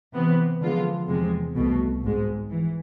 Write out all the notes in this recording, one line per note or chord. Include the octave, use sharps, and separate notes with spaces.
C3 E3 B3
D3 F3 G#3 B3 F4
E2 C3 F3 G#3
C2 B2 A3
G#1 G#2 G#3
E3